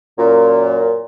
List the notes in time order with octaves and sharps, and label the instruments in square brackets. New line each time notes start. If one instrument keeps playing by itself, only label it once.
[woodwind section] F#2 A#2